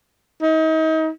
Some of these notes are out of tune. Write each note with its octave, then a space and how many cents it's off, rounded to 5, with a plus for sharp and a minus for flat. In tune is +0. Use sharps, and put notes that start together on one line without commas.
D#4 +35